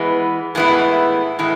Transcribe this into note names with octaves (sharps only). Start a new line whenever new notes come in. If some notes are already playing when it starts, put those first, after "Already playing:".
Already playing: E3 G#3 B3
A2 E3 G#3 B3 E4
A2 E3 G#3